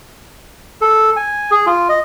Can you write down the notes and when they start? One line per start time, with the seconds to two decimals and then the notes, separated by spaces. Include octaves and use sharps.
0.81 A4
1.16 G#5
1.51 G#4
1.66 F4
1.89 D#5